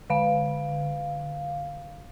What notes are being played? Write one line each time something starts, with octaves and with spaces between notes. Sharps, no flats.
D3 F5